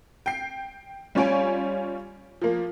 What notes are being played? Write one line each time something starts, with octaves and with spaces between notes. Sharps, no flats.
G5 C7
G3 C#4 F4 C#5 G#5 D7
F3 A#3